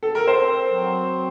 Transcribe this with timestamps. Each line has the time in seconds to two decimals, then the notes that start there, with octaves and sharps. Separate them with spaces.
0.03 A4
0.15 A#4
0.27 C4 C5
0.71 F#3